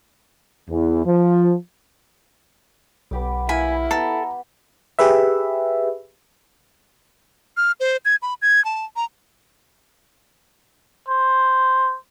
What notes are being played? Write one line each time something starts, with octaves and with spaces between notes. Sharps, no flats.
E2
F3
B1 B3 G4 D6
A#3 E4 G#5 B5
B3 A4 G5 A#5
G4 G#4 B4 E5
F6
C5
G#6
B5
G#6
A5
A#5
C5